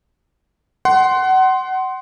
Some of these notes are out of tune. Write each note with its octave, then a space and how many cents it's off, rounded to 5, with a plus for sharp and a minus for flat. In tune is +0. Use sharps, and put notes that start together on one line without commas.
F#5 +25 C6 +0